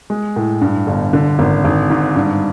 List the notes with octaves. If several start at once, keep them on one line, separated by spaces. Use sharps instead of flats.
G#3
A2
G2
G1
D3
G#1
G#1
G#2
G2